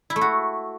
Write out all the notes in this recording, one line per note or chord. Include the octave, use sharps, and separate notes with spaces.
E4
A3
F#4